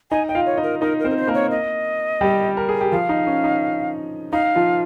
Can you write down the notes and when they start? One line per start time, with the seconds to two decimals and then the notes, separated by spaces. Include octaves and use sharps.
0.11 D#4 D#5 G#5
0.28 D#5 G5
0.35 F4 F5
0.46 C#5
0.57 D#4 D#5
0.63 A#4
0.81 D#4 A#4 D#5
0.99 A#4
1.04 C4 C5
1.11 A#4
1.16 C5
1.27 A#3 A#4
1.34 C#5
1.51 D#5
2.21 G3 G4
2.57 A#4
2.69 G#4
2.81 G4
2.92 F3 F4 F5
3.09 D#4
3.27 C#4
3.44 D#4
4.32 D#4 F5
4.55 F3 F4